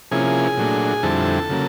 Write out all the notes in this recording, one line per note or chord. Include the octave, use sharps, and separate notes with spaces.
C3 F3 A#3 C#4 E4 G#4 G#5
A#2 F#3 A3 D4
F2 D3 G3 C4 E4 A4 A5
C#3 F#3 A#3